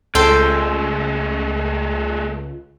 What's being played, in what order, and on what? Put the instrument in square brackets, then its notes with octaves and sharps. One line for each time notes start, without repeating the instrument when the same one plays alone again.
[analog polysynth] C#2 [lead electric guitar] G#3 A3 [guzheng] A4 C5 G5